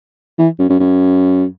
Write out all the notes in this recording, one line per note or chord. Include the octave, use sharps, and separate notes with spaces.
E3
F#2
F#2
F#2